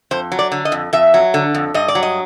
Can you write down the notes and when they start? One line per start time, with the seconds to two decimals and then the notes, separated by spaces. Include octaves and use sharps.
0.11 F2 C5
0.32 F#3
0.39 D5
0.52 D3
0.65 D#5
0.72 F2
0.93 F2 E5
1.14 F#3
1.34 D3
1.55 F2
1.74 G2 D#5
1.88 D5
1.95 F#3
2.03 D#5